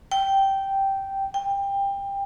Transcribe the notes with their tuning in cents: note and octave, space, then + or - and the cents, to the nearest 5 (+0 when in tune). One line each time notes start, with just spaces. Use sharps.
G5 -10
G5 +20